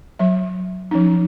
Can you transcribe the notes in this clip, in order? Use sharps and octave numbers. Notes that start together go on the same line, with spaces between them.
F#3 E5
F3 C#4 D#4